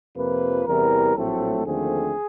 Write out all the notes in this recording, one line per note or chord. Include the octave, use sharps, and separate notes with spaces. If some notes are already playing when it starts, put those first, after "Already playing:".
F2 C3 F3 A#3 B4
E2 C3 E3 G3 A#4
A#1 A2 F#3 A3 C4 A4
D#2 D3 F3 A3 C4 G#4